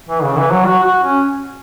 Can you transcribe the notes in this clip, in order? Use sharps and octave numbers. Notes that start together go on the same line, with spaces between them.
E3
C#3
E3
F#3
F#4
F#4
C#4